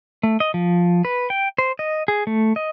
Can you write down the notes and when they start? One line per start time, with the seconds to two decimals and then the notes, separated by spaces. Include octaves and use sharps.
0.23 A3
0.40 D#5
0.54 F3
1.05 B4
1.30 G5
1.58 C5
1.79 D#5
2.08 G#4
2.27 A3
2.56 D#5